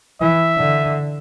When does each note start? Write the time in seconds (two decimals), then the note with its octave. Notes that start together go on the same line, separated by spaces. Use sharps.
0.21 E3 E5
0.58 D3